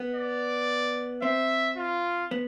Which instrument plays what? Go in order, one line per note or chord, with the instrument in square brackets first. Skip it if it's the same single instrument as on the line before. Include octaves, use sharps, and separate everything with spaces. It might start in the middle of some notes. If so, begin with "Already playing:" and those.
Already playing: [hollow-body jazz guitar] B3
[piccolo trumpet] D5
[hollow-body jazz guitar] C4 [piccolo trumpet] E5
[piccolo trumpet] F4
[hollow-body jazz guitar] B3